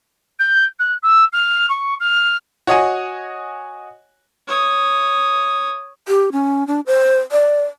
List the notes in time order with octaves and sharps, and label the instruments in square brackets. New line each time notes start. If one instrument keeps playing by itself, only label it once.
[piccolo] G6
F#6
E6
F6
C#6
F6
[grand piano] F#4 C#5 D#5 F#5 G#5
[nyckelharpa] C#5 D#6
[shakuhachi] G4
C#4
D4
C5
D5